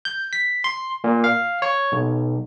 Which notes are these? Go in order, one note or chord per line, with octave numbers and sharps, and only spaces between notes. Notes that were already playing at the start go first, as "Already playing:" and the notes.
G6
B6
C6
A#2
F5
C#5
B1